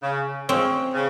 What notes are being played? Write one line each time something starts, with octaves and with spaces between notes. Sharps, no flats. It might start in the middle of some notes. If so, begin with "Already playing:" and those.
C#3
F3 G#3 C4 C#4
C#3